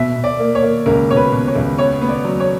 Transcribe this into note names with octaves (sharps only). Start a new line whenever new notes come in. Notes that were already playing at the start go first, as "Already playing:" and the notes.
Already playing: B2 E5
B2
D5
A#3
C#5
A#3
C#2 A#4
B2 C#5
B4
B2
C#5
C#2
B3 C#5
B3
D5
F#3
C#5